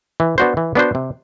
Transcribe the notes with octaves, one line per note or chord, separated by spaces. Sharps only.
E3
B3 D4 F#4 C5
E3
B3 D4 F#4 C5
C3